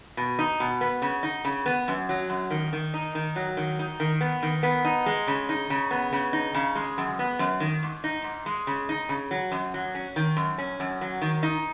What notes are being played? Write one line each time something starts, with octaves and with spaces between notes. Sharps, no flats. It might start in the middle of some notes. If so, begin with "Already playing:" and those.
B2
D#4
B2
B3
C#3
D#4
C#3
B3
F#2
F#3
F#2
D#3
D#3
D#4
D#3
F#3
D#3
D#4
D#3
B3
D#3
B3
D#4
G#3
C#3
D#4
C#3
B3
C#3
D#4
C#3
G#3
F#2
B3
F#2
D#3
G#2
D#4
G#2
G#3
C#3
D#4
C#3
F#3
F#2
F#3
C#4
D#3
F#2
C#4
F#2
F#3
D#3
D#4